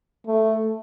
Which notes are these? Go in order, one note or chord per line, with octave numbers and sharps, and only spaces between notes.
A3